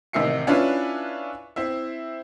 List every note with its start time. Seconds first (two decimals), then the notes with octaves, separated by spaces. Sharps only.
0.13 A1 C3 D#3 E5 C7 C#7
0.47 C#4 D4 E4 F4 B4
1.56 C4 E4 E5